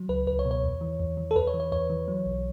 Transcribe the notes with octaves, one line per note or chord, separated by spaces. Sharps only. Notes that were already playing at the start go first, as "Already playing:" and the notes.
Already playing: F#3
C#2 B4
C#2 B4
C#5
B2
C#5
E2
E3
E2
E3
A4
E2 B4
C#5
E3
C#5
E2 C#5
E3
F#3
B1